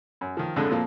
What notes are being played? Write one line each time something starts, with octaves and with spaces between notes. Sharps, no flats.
F#2
D#3 F3
F2 A2 D3 G#3 A3 D4
F2 A#2 F3 A#3